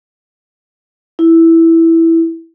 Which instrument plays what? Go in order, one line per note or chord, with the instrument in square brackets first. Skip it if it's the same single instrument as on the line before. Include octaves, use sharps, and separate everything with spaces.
[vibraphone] E4